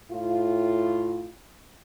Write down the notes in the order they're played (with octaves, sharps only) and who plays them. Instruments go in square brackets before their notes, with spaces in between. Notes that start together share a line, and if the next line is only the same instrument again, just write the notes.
[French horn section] A2 F4